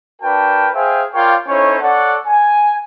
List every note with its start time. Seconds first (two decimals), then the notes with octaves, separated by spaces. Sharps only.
0.22 D4 F#4 A#4 B4 G5 A5
0.75 G#4 C5 E5 F5 G5 G#5
1.14 F4 A#4 C#5 D5 F5 G5
1.48 C#4 D#4 E4 A4 C5 C#5
1.82 A4 C#5 D5 F#5
2.27 G#5